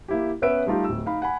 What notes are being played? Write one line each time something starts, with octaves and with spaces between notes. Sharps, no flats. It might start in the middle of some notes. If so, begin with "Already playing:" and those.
A#3 E4 G4
B3 C#4 B4 E5 E6 D7
G3 A3 D#4 F4 G4
D1 E6
D#4 F5 B5
F#5 G#5 B5